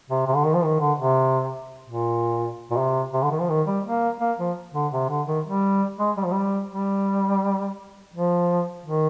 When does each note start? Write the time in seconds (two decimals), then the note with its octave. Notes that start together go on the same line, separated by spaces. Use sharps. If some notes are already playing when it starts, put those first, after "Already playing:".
0.10 C3
0.27 C3
0.35 D3
0.45 D#3
0.54 F3
0.64 D#3
0.80 D3
0.99 C3
1.88 A#2
2.70 A#2
2.77 C3
3.13 C3
3.23 D3
3.31 D#3
3.40 F3
3.49 D#3
3.67 G3
3.84 A#3
4.20 A#3
4.39 F3
4.74 D3
4.93 C3
5.09 D3
5.27 D#3
5.45 G3
5.99 G#3
6.17 G3
6.25 F3
6.33 G3
6.71 G3
8.14 F3
8.85 D#3